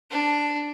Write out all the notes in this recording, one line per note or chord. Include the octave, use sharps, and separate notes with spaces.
D4